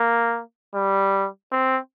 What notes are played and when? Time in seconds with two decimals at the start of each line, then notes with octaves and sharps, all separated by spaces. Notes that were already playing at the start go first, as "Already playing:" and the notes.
Already playing: A#3
0.75 G3
1.52 C4